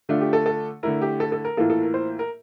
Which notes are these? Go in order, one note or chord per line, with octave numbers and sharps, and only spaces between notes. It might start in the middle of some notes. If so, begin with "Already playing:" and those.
D3 A3 D4 F4
G4
A4
A4
D3 A3 E4 A#4
G4
A4
A4
A#4
A2 E3 A#3 F4 A4
A4
A#4
C5
A#4